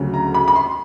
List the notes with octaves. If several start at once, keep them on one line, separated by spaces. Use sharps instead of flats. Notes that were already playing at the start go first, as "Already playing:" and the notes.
Already playing: D2 C#3 F#3
A#5
B5
B5
C6